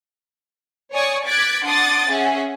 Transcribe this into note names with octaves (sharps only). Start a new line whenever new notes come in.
C#5 D5 G#5 C#6 D#6
D6 F#6 G#6 A6 B6 D7
D4 F#5 C6 D6 D#6 A6
C#4 G#4 E5 F#5 G#5